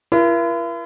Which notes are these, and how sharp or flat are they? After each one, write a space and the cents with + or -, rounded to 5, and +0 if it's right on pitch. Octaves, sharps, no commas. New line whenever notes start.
E4 +45 A#4 +40